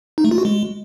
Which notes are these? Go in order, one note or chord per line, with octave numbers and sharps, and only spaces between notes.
D#4
A3
F4
F#4
G#3